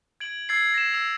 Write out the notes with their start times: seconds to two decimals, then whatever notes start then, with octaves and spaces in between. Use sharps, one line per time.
0.20 G#6 D7 F#7
0.49 E6 G#6 A6 C7
0.74 A#6 E7
0.93 E6 F7